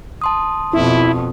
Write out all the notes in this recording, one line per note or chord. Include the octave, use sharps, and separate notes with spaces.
A5 C6 D#6
F2 B2 E4